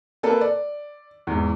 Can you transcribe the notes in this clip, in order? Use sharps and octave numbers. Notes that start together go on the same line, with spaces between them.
A#3 A4 B4
D5
E2 G#2